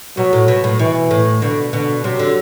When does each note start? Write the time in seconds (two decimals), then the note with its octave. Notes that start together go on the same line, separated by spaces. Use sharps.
0.17 B2 F#3
0.33 A2
0.48 B2
0.64 A2
0.79 B2 E3
1.11 A2
1.42 B2 D3
1.72 B2 D3
2.04 C3 F#3
2.19 D3